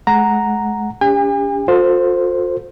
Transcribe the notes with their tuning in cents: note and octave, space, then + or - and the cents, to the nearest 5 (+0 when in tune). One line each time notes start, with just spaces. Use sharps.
G#3 +35 F#5 +0 A#5 +0
C#4 +45 G4 +35 G#5 -45
F4 +45 A4 +25 C5 +0